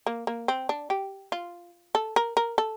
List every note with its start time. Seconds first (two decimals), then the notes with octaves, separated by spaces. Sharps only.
0.06 A#3
0.27 A#3
0.48 C4
0.69 D4
0.90 G4
1.32 F4
1.95 A4
2.16 A#4
2.37 A#4
2.58 A4